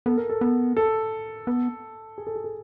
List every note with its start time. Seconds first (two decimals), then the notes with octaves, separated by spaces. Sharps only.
0.06 B3 A4
0.17 A#4
0.30 A4
0.41 B3
0.77 A4
1.47 B3
2.18 G#4
2.27 A4
2.36 G#4
2.44 A4